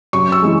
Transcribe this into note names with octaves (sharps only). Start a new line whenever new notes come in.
F#2 C#6
E6
E3 G#3